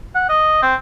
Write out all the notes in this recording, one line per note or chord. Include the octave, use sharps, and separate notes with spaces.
F#5
D#5
C4